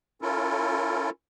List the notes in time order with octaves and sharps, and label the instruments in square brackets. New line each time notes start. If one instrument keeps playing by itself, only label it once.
[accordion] C#4 E4 F4 A4 A#4